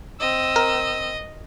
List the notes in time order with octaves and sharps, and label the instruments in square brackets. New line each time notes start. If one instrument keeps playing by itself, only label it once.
[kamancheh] C4 E6 [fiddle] D#5
[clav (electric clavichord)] A#4